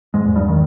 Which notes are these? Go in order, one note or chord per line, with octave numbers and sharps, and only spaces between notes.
G#2 G#3
E2
G2 G3
D#3